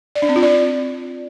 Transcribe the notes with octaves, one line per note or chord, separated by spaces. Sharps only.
D5
D4
C4
F4
D5